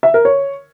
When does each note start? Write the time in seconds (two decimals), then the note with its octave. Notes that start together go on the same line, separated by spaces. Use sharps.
0.03 E5
0.14 A#4
0.25 C#5